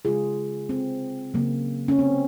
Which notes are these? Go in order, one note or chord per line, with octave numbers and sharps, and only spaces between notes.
C#3 G#3 F4 G#4
C4
C#3 F#3 A#3
C#4
C4